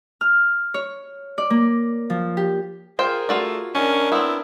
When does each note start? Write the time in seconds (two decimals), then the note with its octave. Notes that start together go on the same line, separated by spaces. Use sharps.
0.21 F6
0.74 C#5
1.38 D5
1.50 A#3
2.10 F3
2.37 G4
2.99 F4 G#4 A#4 C5 G5
3.29 A3 F4 F#4 D5
3.75 D#3 C#4 D4 A#4
4.12 B3 C4 E4